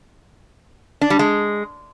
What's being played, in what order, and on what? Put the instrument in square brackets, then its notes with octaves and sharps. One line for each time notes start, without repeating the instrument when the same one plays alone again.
[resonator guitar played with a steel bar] D4
G3
G#3